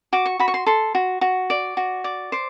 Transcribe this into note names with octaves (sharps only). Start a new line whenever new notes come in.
F#4 D6
C#6
F#4 B5
C#6
C6
A4 C6
F#4
F#4
D5
F#4
D5
C5 D6